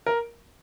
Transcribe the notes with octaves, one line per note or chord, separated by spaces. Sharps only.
A#4